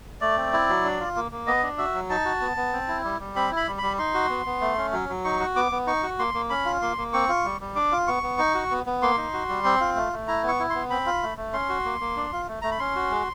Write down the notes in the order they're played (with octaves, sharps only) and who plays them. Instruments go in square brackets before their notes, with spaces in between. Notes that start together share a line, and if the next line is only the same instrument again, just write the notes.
[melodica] A3 D5
C4
E4
F#3
D4
F4
A#3
A#3
B3 D#5
D4
F#4 E5
F#3
D#4 A5
F#4
B3
B3
C4
E4
G3
G3
C4 B5
E4
B5
G3
G3 B5
D#4 C6
F#4
B3
B3
A3
C#4
F#3
F#3
D#4 C#6
F#4
B3 D6
B3
D#4 C#6
F#4
A#3 C6
A#3
C#4 B5
F4
A#3 C6
A#3
C4 C#6
F4
G3
G3
D4 D6
F4
B3 C#6
B3
D#4
F#4
B3
B3
A#3 C6
D#4
F#4
G3
C4
F4
A3
A3
E4 A#5
B3
C#6
E4
B3 C6
C4 B5
F4
A3
A3
C#4 C6
F#4
A#3
A#3
D4
F4
A3
A3 A#5
B5
C#4 C6
F#4
G#3